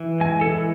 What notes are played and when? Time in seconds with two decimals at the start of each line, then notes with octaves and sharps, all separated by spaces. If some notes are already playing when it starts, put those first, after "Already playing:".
Already playing: E3
0.20 G#3 G#5
0.41 A4
0.51 E3